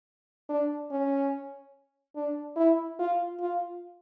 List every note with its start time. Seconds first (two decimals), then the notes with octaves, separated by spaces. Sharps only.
0.50 D4
0.91 C#4
2.16 D4
2.57 E4
2.99 F4
3.40 F4